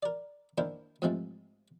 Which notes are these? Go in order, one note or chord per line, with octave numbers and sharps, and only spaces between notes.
A#4 D5
D#3 A#3 D4 E4 A#4 C5
G#2 C3 E3 F3 G#3 A3